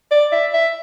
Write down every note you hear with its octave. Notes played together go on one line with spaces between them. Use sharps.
D5
E5
E5